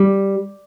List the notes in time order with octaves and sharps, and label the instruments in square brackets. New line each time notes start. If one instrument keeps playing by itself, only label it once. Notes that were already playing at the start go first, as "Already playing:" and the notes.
Already playing: [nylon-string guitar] G3